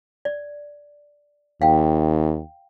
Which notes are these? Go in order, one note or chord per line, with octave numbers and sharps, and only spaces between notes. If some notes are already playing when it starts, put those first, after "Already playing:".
D5
D#2 F5 G5